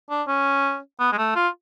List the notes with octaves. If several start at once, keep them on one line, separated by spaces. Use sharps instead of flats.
D4
C#4
B3
G#3
A3
F4